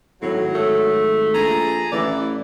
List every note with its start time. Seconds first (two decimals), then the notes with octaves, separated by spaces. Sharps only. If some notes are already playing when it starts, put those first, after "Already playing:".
0.22 G#1 A2 F#3
0.55 A3
1.34 A#1 G#4 A5 A#5
1.92 A1 E3 D5